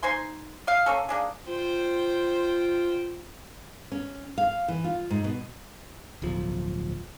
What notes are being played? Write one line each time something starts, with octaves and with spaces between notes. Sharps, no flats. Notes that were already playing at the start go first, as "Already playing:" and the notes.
D#4 C5 G#5 C6
D#5 F5
A#3 C#4 A4
A#3 D4 G#4
F4 C5 G5
C#4
F5
E3
F4
G#2
B2
D1 B1 F3